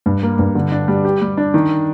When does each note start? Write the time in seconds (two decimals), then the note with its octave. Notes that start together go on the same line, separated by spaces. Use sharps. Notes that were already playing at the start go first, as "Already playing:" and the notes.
0.06 G2
0.23 A#3
0.39 G2
0.55 D3
0.72 D4
0.88 G3
1.05 G4
1.22 G3
1.37 D4
1.54 D#3